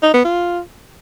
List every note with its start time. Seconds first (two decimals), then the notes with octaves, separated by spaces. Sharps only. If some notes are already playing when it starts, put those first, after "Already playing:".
0.03 D#4
0.14 B3
0.25 F4